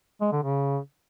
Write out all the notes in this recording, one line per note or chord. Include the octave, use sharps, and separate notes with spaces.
G#3
D3
C#3